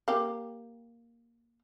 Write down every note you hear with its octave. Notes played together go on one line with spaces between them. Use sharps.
A#3 G4